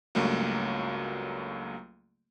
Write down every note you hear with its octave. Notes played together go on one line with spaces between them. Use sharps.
C#2 G2 F#3 A3 A#3